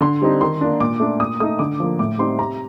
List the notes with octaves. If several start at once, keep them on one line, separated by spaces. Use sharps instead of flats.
D3 C6
G3 C4 D#4
D#3 C6
A#3 D4
A#2 D6
A3 D4
A#2 D#6
A3 D#4 D#6
D3 D6
F3 A#3
A2 D6
G3 C4 D#4 C6
C3 A#5